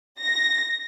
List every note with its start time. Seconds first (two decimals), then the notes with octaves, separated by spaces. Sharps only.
0.20 A#6